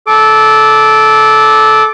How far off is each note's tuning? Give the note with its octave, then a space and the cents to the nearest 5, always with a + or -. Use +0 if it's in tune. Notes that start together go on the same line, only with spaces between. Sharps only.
A4 -15 D6 +0